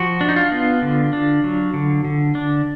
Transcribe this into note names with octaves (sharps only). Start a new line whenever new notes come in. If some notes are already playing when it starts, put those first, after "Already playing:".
Already playing: F3 F#4
D4
D#4
F4
B3
D3
D4
F#3
D3
D3
D4